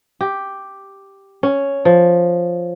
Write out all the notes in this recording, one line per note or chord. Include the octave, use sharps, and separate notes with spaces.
G4
C#4
F3